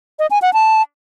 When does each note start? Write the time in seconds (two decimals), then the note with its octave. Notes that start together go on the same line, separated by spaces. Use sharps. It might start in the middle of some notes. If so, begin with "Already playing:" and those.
0.19 D#5
0.31 G#5
0.42 F#5
0.54 A5